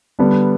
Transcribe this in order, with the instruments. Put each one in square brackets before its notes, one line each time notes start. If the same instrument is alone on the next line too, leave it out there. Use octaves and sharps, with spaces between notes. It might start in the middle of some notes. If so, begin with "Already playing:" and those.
[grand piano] D3 G3 B3 D4